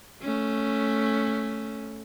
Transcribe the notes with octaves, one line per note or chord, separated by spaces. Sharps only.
A3 C#4